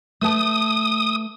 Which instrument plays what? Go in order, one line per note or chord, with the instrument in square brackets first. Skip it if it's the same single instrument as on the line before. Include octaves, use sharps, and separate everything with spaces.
[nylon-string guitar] A3 B4 A5 [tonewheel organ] D#6